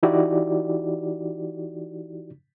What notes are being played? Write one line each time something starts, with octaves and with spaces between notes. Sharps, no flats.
E3 D#4 E4 F#4 G4 D5